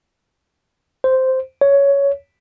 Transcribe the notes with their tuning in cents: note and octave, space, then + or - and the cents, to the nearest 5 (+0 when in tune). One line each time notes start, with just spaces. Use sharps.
C5 -5
C#5 +10